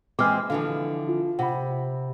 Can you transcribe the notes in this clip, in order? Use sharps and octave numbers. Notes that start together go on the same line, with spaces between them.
E3 G#3 C4 D6 F6
D3 E3 F3 F5
F4
C3 F#5 B5